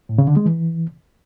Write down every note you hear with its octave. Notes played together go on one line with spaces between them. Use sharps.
A2
C#3
D3
G#3
E3